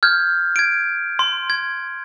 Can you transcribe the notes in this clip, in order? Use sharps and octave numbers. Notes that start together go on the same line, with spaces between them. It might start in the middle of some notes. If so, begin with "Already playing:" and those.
F6 G6 G#6
G#6 D7
C6
G#6